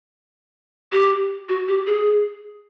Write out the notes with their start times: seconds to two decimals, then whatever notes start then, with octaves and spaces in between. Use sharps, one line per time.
0.92 G4
1.49 F#4
1.68 G4
1.87 G#4